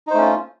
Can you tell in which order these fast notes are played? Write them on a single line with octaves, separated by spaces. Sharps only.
D#4 C5 A3 C#4 F4